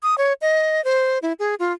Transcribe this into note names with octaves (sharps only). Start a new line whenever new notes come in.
D#6
C#5
D#5
C5
E4
G#4
F4